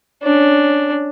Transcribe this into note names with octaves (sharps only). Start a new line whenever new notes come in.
C#4 D4